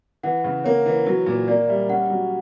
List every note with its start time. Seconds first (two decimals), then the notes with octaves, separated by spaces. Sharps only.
0.23 E3 F#5
0.44 C#3
0.64 A#3 C#5
0.86 E3
1.06 F#3
1.26 A#2
1.48 A#3 D5
1.68 G3 E5
1.89 C#4 F#5
2.10 F#3